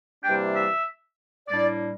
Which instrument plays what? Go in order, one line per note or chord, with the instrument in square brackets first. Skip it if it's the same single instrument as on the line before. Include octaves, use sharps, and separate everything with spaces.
[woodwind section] C3 E3 G3 A#3 D4 G5
E5
A2 G3 A#3 D4 D5